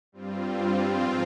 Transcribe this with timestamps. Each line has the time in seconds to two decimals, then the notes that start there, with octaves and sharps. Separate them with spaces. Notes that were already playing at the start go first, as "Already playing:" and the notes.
0.12 G2 G3 C4 F4
0.90 G#2 F3 C4 F4